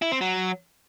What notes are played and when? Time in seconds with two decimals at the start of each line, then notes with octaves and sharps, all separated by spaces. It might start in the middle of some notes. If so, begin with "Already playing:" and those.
0.02 E4
0.12 C4
0.21 F#3